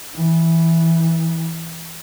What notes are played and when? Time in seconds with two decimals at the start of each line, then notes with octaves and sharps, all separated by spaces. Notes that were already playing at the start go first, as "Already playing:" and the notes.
0.16 E3